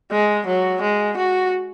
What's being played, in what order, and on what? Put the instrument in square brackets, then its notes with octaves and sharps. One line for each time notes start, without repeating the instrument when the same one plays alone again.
[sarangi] G#3
F#3
G#3
F#4